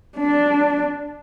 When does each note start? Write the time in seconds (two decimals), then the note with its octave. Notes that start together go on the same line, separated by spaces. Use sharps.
0.18 D4